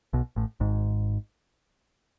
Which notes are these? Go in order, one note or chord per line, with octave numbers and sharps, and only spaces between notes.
B1 B2
A1 A2
G#1 G#2